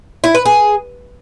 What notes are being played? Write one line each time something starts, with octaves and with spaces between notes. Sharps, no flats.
E4
B4
G#4